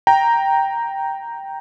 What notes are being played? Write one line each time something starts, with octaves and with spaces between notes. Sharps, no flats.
G5 A#5